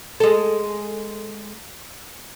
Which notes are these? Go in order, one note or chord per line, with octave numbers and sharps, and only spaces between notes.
G#3 A4